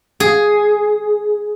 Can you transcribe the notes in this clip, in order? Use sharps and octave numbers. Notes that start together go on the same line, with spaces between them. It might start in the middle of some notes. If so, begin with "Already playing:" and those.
G#4